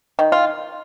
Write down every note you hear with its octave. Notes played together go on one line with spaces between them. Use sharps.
D#3
F4